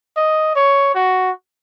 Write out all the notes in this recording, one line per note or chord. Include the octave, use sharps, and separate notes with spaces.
D#5
C#5
F#4